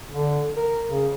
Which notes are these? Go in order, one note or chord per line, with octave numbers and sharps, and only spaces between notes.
D3
A#4
C#3